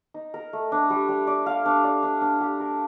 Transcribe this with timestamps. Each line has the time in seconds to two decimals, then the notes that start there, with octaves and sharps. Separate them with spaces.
0.14 D#4
0.34 A#4
0.53 A3
0.72 D4
0.90 G3
1.08 G3
1.27 D5
1.46 F5
1.66 D4
1.84 D5
2.03 D4
2.21 D4
2.40 G4
2.60 A#4